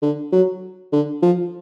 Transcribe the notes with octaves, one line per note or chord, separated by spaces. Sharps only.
D3
F#3
D3
F3